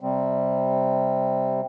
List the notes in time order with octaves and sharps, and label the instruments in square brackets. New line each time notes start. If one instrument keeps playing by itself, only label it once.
[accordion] C3 G3 C4